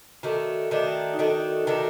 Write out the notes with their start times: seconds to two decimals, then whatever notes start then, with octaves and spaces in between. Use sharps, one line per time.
0.23 D#3 A3 D4 F#4
0.71 D#3 A3 D4
1.14 D#4
1.19 D#3 A3 D4 F#4
1.67 D#3 A3 D4 A4